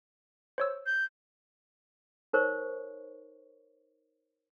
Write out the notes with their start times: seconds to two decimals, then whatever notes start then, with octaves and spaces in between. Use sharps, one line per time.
0.58 C5 C#5 E6
0.86 G6
2.33 D#4 A#4 C5 C#5 C#6